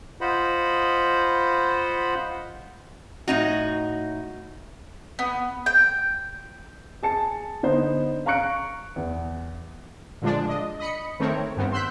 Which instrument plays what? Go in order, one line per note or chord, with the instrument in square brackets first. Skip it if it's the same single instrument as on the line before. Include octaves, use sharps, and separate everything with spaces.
[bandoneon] F4 C5 D#5 F#5 B5
[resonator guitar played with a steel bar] A2 D#4 F#4
[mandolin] B3
G5
[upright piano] G#4 A5 C#7
D3 B3 D#4 C5
F5 A#5 C#6 F#6 C#7 D7
E2
[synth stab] A#2 D3 F3 G#3 D4
D#5
D#5 B5 C#7
D#3 A3 C4 A#4 C#5
G2 D#3 B3 C4
C6 E6 F#6 G6 B6